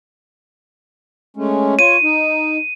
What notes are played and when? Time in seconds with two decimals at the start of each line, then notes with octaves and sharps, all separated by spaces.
1.37 G#3 A3 C#4
1.79 F4 C#5 D#7
2.03 D#4